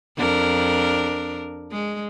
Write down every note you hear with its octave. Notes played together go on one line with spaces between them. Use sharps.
F2 D4 A#4
G#3